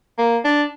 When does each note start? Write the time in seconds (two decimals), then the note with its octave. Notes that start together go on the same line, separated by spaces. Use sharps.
0.18 A#3
0.44 D4